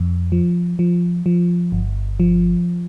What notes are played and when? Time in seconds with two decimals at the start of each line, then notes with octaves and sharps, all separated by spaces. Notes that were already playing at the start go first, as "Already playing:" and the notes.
Already playing: F2
0.32 F3
0.79 F3
1.26 F3
1.72 G1
2.20 F3